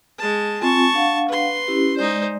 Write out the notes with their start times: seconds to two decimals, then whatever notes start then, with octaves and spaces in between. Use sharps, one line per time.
0.19 G#3 A5
0.61 C4 F4 G#5 A5 C#6
0.94 D4 F5 F#5
1.29 B4 C6
1.68 C#4 E4 G4
1.96 G#3 D#4 C5 D5